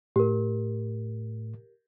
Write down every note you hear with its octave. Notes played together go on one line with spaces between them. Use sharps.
A2 G4 A#4